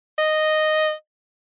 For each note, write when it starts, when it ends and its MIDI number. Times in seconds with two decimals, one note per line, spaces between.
0.18 0.92 75